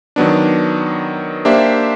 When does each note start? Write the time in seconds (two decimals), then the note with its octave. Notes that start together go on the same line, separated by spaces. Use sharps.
0.16 D#3 F#3 B3 D4
1.45 A#3 D4 G4 C5 E5